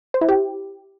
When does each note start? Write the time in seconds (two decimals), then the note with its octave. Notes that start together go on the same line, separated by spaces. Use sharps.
0.14 C5
0.21 E4
0.29 G4